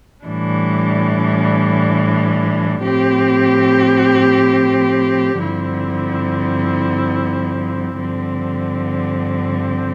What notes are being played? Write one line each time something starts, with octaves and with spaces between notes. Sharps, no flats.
A2 E3 G3 D4
A2 F3 C4 G4
G2 D3 F3 C4 E4
G2 D3 F3 C4